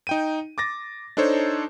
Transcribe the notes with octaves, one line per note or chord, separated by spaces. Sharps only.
D#4 G5 D#7
D6 A6 A#6
D4 D#4 A4 C5 C#5